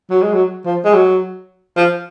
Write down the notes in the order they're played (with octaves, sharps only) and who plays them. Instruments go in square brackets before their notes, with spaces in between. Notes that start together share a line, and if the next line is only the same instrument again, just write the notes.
[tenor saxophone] F#3
G#3
F#3
F3
G#3
F#3
F3